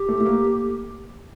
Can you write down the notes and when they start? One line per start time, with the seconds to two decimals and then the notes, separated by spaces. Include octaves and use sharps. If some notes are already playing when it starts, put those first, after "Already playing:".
Already playing: G4
0.09 A3
0.20 A3
0.25 A#3